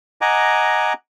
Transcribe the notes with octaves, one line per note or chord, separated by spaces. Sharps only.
D#5 F#5 G#5 A#5 D6